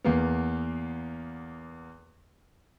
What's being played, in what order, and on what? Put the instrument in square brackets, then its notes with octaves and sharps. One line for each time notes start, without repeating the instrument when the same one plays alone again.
[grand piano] E2 A#3 B3